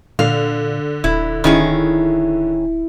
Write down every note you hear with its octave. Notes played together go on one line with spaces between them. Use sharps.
A#2 D3 F5
D#1 E4
D1 D#3 C#4 E4 G#4